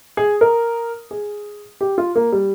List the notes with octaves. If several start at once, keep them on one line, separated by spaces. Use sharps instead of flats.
G#4
A#4
G#4
G4
F4
A#3
G3